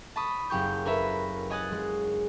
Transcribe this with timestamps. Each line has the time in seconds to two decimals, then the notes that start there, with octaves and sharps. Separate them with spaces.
0.16 A5 B5 C#6 D#6
0.50 F#1 G4 C#6 G6
0.85 A#4 B4 C#5 E5 B5
1.50 C#5 D#5 G#5 D#6 F#6 A6
1.71 G#3